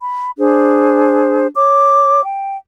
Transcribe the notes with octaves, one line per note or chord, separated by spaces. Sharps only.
B5
D4 G#4 C5
C#5 D6
G5